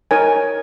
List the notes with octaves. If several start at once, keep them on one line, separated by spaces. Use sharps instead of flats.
D#4 A#4 C#5 G#5